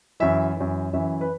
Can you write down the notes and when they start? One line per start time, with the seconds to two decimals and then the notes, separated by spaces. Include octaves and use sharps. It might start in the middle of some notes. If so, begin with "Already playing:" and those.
0.20 F#2 E3 E5
0.57 F#2 E3
0.93 F#2 E3 E5
1.21 B4